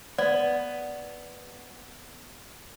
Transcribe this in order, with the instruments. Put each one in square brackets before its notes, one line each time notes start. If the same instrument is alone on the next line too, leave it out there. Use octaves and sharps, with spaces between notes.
[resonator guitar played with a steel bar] B3 [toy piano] D5